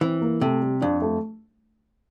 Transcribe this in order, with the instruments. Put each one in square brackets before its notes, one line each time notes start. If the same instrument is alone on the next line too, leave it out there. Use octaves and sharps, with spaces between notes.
[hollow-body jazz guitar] E3 [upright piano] C4
[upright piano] A#3
[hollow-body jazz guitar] C3 [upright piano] A3
[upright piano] G3
[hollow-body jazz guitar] F2 [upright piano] D4
[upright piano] A3